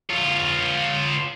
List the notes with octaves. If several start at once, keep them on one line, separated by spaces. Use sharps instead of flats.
F4 C#5